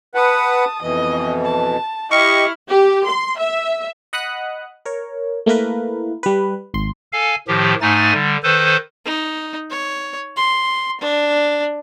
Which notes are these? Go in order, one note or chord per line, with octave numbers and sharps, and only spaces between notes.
B4 F#5 A5 D#6
F2 B2 E3 D#5
A5
E4 G4 D#5 C#6 F6
G4
C6
E5
D#5 F#5 B5 D#6 F#6
A#4 C#5
A3 A#3 E4 A#4 B4
G3 B4
G#1 C6
A4 F5 G#5
A2 D#3 F3 G4
G#2 A3 D#4 G#5 A6
D3 G3
D#3 A4 B4 C5
D#4
C#5
C6
D4